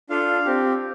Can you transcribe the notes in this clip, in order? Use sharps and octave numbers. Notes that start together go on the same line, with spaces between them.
D4 F4 A4 F5
C4 G4